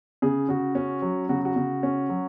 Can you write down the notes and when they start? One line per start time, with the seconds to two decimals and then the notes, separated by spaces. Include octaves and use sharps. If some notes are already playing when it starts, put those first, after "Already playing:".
0.22 C#3 G#4
0.49 C#3 F#4
0.75 C#4 F#4
1.02 F#3
1.29 C#3 F#4
1.45 F#4
1.56 C#3
1.83 C#4
2.09 F#3